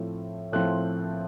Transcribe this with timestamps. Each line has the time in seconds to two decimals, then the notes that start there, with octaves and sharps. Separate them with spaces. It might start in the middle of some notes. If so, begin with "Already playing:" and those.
Already playing: A2 F3 A3 C4 F4
0.52 A2 F3 A3 C4 F4 F#6